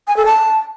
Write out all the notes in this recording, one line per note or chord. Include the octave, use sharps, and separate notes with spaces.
G#5
A4
A5